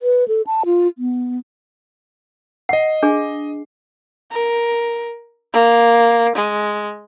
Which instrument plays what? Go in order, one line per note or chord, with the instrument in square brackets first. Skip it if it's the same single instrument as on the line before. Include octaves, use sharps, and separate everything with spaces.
[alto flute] B4
A4
A5
F4
B3
[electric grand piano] D#5 C7 [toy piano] F#5
[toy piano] D4 G#4
[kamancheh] A#4
A#3
G#3